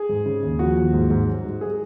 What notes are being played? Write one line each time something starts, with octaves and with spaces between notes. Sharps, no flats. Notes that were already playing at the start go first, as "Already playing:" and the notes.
Already playing: G#4
G#2
C#3
D#2
F3 F#4
D#2
G#2
G#2
F#3
G#2
G#4